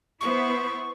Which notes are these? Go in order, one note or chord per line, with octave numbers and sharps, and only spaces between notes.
B3 E4 C5 C#6